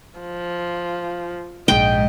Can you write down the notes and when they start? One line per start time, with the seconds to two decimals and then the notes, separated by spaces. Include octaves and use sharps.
0.19 F3
1.68 A#1 G#2 G#3 D#5 G5